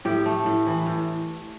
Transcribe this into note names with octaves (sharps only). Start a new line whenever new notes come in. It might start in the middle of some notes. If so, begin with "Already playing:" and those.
A2 G4
A3
A2
E3
A2